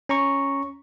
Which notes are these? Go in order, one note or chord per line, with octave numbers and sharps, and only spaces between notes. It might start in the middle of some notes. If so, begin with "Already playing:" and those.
C#4 A#5 C#6